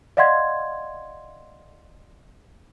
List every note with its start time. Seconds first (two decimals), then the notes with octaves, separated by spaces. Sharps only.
0.17 D5 D#5 F5 F#5 C6 G#6